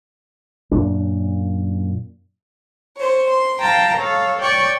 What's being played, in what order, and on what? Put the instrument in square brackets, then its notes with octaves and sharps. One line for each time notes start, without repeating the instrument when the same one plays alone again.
[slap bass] F#2 A#2 D4
[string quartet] C5 C#5
C6
F5 G5 A5 A#5
A4 C#5 F5
C#5 D5 G5 C#6